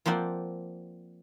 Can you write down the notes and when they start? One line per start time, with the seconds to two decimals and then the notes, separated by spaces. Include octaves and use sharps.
0.06 F3 A#3 C4 D5 F#5